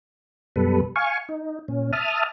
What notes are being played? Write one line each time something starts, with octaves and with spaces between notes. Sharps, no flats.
F#2 B2 G3 A4 B4
F5 G#5 C#6
D#4
A#2 C#4
E5 A5 D#6 F6